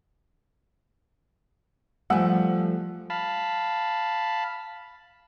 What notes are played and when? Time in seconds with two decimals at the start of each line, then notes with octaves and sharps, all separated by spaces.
2.10 F3 G3 A3 F#5 G#5 E6
3.10 F5 A5 B5